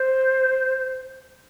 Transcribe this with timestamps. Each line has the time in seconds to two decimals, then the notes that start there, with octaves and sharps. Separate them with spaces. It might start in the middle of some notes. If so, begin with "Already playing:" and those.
Already playing: C5